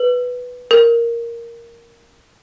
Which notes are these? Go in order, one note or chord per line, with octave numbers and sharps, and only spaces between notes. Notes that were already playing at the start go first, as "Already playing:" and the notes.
Already playing: B4
A#4